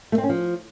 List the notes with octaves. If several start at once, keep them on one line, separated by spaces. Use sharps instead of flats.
A3
C4
C#4
F3